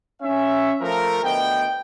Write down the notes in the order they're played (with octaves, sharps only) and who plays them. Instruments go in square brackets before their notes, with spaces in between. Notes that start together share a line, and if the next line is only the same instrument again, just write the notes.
[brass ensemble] C#4 E5
F3 A3 A#4
D2 B3 D#5 G5